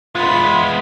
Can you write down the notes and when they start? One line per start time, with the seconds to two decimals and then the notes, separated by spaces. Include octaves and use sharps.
0.15 G#3 B3 F4 B5 C6